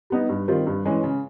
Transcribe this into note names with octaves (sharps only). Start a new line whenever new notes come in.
G3 B3 D#4
G2
D#3 G3 C4 F4
G2
E3 G#3 C#4
C#3